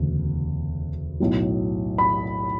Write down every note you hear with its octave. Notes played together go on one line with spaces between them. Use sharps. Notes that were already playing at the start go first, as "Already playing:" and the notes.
Already playing: E1 D2 C#3
B1 A2 F#3
B5